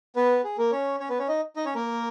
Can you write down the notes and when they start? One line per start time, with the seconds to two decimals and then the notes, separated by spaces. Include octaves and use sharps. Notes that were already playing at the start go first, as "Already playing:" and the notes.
0.16 B3 B4
0.44 G#4
0.58 A#3 A#4
0.72 C#4 C#5
1.00 C#4 C#5
1.10 B3 B4
1.19 C#4 C#5
1.28 D#4 D#5
1.56 D#4 D#5
1.66 C#4 C#5
1.75 A#3 A#4